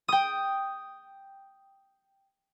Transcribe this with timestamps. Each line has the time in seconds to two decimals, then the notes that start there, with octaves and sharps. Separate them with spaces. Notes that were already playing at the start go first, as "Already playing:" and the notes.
0.08 G5 D#6